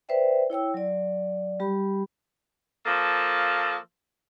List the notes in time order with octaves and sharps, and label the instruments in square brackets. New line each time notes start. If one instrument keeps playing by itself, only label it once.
[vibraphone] B4 C5 D5 E5 G5
E4 C#5 G5 E6
F#3 D5
G3 G4 B5
[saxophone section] F3 A#3 A4